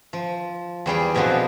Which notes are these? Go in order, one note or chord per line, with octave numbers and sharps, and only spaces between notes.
F3
E2 G3 G#4 G5
F2 B2 D3 F3 B3